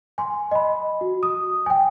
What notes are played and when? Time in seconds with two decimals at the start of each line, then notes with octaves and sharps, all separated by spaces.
0.18 G#5 C6
0.51 D#5 B5
1.01 F#4
1.23 D#6
1.66 G5 G#5